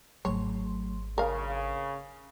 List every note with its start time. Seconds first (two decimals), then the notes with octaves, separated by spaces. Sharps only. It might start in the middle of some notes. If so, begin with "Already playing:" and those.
0.25 G#1 F#3 A3 C#5 C6
1.18 C#3 D4 A#4 F5